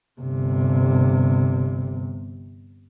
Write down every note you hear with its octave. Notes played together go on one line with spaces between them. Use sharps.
G1 C3